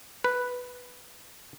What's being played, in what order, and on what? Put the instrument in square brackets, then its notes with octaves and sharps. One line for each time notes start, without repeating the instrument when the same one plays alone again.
[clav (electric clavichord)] B4